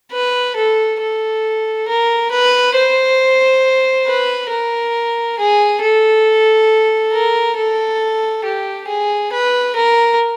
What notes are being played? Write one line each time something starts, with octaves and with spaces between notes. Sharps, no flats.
B4
A4
A4
A#4
B4
C5
B4
A#4
G#4
A4
A#4
A4
G4
G#4
B4
A#4